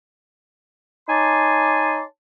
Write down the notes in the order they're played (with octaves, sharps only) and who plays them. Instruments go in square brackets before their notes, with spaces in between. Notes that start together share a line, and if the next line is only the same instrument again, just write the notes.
[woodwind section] D#4 C#5 G#5 A5 C6 D6